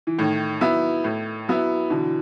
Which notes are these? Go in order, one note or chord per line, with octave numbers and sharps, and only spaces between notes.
E3
A2 D#3
F#3 B3 E4
A2
F#3 B3 E4
B2 D3 E3